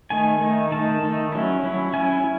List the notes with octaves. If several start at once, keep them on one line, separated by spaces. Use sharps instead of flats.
D#3 A3 D#4 G#5
D#3 A3 D#4
D#3 A3 D#4 A5
D#3 A3 D#4
F#3 C#4 E4
F#3 C#4 E4
F#3 C#4 E4 G#5
E4